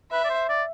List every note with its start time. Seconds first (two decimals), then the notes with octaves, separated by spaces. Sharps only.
0.12 B4 E5
0.24 D5
0.30 C5
0.49 D5